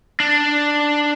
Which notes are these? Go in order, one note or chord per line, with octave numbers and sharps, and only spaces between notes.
D4